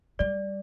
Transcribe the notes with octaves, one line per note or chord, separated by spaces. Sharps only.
G3 D5